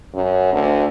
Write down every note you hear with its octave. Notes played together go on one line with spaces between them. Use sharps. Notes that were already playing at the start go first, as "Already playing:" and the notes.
F#2
D2